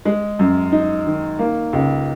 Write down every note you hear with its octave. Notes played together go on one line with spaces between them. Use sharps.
G#3
F#2
D#4
D#3
A#3
C#2